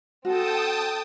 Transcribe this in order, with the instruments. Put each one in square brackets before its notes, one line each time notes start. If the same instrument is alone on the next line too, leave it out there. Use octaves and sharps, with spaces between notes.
[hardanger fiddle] C4 A4 [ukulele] F#4 [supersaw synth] G5 A5 D#6